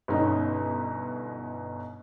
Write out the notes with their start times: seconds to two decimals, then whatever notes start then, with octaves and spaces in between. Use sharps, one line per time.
0.08 G1 B2 C#4 D#4